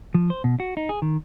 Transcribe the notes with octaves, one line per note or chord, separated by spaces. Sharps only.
F3
C5
B2
F#4
D#4
G#4
D#3